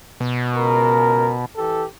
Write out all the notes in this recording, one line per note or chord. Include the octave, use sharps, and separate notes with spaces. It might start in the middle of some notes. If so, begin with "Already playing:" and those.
B2
C#2 A#4
E3 G4 A4